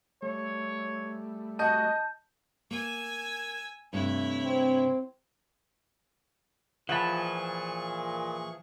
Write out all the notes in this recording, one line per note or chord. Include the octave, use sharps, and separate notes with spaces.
G3 A3 C#5
F#4 D#5 A5 G6
A#3 G#5 E6
G2 C3 A3 E4 C#5
C4
A#2 E3 F3 G#4 F#5 A5 B5 C#6